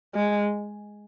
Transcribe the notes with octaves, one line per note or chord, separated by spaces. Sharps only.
G#3